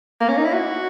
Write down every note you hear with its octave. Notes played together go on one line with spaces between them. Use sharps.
A#3
C#4
D#4
E4
F#4